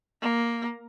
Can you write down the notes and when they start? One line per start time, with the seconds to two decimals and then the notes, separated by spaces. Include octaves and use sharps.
0.22 A#3